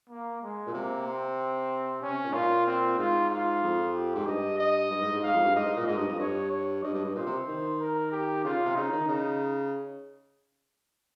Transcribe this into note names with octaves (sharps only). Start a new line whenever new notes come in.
A#3
G#3
A#2
C3 A#3
C4
C3 C#4
A#2
G#2
A#2 F4
C4
G#2 F4
F4
F2
G4
G#2
G2 D#5
D#5
G2
G#2
G#2
G#2 F5
F2
G2
G#2 D#5
G#2
A#2
G#2 D#5
G2
F2
G2 C#5
C#5
G2 D#5
G2
G2
A#2 C5
C3
D#3
A#4
G4
C#3 F4
C3
C#3 D#4
D#3
C#3 D#4